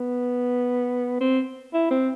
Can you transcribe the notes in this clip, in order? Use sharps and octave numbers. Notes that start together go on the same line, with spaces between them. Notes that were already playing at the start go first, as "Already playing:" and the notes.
Already playing: B3
C4
E4
C4